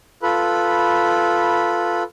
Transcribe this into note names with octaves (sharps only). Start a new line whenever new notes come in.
F4 A4 B4 B5